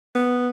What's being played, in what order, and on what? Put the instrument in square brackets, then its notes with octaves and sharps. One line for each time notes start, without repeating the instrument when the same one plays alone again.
[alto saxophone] B3